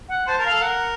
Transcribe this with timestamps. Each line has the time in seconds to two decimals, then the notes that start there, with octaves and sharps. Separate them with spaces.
0.09 F#5
0.27 C5 A5
0.39 A#4
0.45 A4 F5
0.61 A#4 F#5